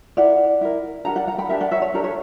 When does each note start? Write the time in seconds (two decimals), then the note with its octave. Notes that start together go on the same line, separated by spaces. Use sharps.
0.17 E4 A#4 D5 F#5
0.61 E4 A#4
1.05 D4 G4 A#4 F#5 A#5
1.16 D5 F#5
1.27 F#5 A#5
1.38 G5 B5
1.49 D4 G4 A#4 E5 G5
1.60 D5 F#5
1.71 C#5 E5
1.82 C#5
1.94 D4 G4 A#4
2.04 C#5